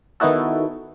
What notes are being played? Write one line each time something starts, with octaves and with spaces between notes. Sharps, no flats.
D#3 B3 D#4 E4 F#4 A4